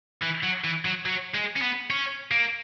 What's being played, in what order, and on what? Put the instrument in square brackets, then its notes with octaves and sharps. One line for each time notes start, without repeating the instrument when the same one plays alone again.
[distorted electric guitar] E3
F#3
E3
F#3
F#3
G#3
C#4
B3
C#4
A#3